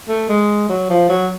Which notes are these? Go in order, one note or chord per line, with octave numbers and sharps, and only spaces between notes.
A3
G#3
F#3
F3
F#3